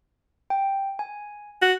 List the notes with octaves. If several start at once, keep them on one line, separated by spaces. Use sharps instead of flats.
G5
G#5
F#4